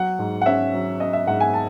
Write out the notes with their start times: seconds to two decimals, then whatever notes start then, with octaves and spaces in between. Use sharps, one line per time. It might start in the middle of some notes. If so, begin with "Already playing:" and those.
Already playing: F#3 F#5
0.19 G#2
0.42 F#5
0.46 C#4 E5
0.74 F#3
1.00 C#4 D#5
1.13 E5
1.27 G#2 F#5
1.40 G#5
1.54 A5